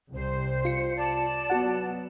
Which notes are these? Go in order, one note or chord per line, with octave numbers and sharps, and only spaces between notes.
C2 C5
F4 C#7
D5 A5
F#3 B3 F#4 F#5